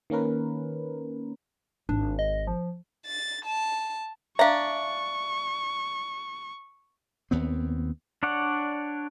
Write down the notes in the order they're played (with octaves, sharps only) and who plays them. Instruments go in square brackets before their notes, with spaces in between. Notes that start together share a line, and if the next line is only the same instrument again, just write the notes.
[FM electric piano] D#3 A#3 C#4 A#4 B4
[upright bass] G#1 [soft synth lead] D4
[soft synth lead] D#5
F3
[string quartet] A6
A5
[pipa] D4 A#5 [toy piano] E5 F5 [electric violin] C#6
[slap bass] D#2 B3 C4
[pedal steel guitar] D4 C#5 D5 F#5